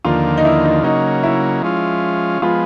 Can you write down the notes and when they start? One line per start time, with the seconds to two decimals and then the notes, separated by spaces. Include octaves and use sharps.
0.04 D#2 D3 F3 A#3 F4
0.37 D#4
0.45 E4
0.65 D#4
0.83 C#3 F#3 A#3 D#4
1.23 E4
1.62 F3 G#3 C#4 F4
2.42 F3 G#3 B3 F4